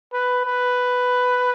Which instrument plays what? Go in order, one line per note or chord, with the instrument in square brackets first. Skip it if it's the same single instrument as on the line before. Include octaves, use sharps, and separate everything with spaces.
[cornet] B4
B4